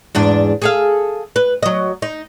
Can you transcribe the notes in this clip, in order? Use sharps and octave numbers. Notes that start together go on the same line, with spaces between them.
E2 G#2 D4
G#4 A4 F5
B4
F#3 D#5
D#4